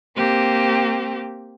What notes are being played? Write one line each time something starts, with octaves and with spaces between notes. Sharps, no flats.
A#3 C4 G4